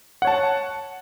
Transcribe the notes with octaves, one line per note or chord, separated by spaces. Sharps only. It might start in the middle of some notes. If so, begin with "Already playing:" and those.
C#5 F#5 A5